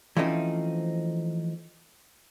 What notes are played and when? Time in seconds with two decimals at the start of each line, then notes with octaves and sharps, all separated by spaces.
0.17 E3 F3 A3 C4 C#4 D#4